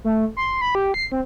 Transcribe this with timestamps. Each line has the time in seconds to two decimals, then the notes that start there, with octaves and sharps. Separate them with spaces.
0.04 A3
0.37 C6
0.61 B5
0.75 G4
0.94 C7
1.12 C4